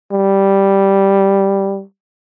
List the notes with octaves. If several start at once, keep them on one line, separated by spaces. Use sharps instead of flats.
G3